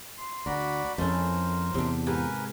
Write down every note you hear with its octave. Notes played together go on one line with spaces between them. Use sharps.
C6
D2 F#4 A#4 D5 B5
F2 A3 C#4 E4 A#4 C5
E2 C3 D4
G#2 G4 A#4 B4 G#5